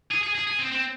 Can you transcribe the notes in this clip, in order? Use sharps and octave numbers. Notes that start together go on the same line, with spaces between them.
G#4
G#4
G#4
G#4
C4
C4